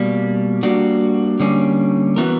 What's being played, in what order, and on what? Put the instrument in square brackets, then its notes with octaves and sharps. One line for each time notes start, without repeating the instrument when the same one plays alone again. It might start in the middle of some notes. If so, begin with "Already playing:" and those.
Already playing: [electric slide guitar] B2 G3 A#3
G3 A#3 D4 F#4
D3 G3 A#3 C#4
E3 B3 F#4 A#4